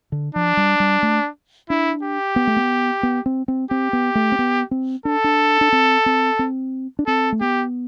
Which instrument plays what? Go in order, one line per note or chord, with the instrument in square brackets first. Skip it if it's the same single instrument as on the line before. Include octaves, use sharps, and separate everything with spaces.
[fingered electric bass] D3
[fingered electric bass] F3 [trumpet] D4
[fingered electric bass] G3
G3
A3
[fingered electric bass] D4 [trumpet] E4
[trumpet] G4
[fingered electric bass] B3
A3
B3
B3
C4
C4
[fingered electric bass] C4 [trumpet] G4
[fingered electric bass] B3
A3
C4
B3
C4
[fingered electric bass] D4 [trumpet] A4
[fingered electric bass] D4
D4
C4
C4
C4
D4
[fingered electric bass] C4 [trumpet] A4
[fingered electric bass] A3
[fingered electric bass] B3 [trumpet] G4